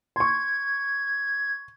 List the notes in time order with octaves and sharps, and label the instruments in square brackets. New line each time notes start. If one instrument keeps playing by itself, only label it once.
[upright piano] C6 C#6 [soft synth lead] G#6